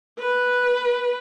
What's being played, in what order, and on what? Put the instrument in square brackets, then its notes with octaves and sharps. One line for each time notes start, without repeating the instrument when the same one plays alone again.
[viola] B4